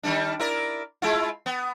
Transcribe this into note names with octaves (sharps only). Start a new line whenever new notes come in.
D#3 G3 D4
E4 A#4 D5
G#3 E4 F4
B3